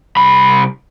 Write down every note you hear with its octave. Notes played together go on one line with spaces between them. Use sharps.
C2 B5